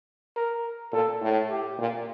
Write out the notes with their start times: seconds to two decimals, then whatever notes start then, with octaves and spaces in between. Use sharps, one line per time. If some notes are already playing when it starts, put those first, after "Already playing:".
0.36 A#4
0.93 A#2 A4
1.21 A2
1.50 G4
1.78 A#2